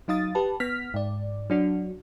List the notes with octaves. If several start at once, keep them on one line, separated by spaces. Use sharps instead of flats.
F#3 D#4 F5 D#6 A6
G4 B4 A5
B3 F6 B6
G#2 D5
F#3 D4 F#4